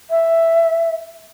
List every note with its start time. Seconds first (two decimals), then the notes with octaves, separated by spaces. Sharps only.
0.10 E5